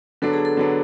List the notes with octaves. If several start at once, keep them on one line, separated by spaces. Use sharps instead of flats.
D3 F#3 B3 D4 A4
G#4
A4
D3 F#3 B3 D4